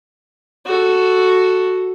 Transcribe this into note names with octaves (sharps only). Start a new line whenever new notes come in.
F#4 A4